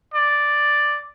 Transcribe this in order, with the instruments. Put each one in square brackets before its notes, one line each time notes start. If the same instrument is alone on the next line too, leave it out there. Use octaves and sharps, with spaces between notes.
[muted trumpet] D5